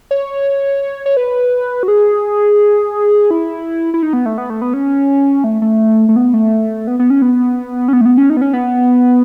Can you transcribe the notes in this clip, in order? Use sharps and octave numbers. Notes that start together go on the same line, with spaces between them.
C#5
C#5
B4
F#4
G#4
E4
E4
D#4
B3
A3
B3
A3
B3
C#4
A3
A3
A3
B3
A3
B3
B3
C#4
B3
C#4
B3
A3
B3
C#4
D#4
B3
C#4
B3